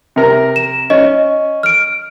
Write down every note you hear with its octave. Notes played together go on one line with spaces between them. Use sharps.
C3 A#4 A#5
E7
C#4 D#5
F6 D7